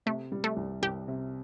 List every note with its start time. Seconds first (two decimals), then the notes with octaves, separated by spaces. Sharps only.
0.06 C3 A3
0.32 G3
0.44 A3
0.57 C2
0.82 C2 G4
1.08 C3